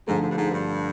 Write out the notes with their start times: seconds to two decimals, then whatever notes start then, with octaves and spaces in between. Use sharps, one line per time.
0.07 G#2 D3 F3 A3
0.22 G#2
0.30 G2
0.36 G#2
0.51 G2